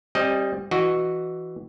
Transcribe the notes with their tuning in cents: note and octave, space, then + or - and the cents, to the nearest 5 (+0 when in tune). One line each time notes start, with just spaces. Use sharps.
G3 +0 C4 +40 D#5 +0
E3 +0 F#4 +0 D#5 -20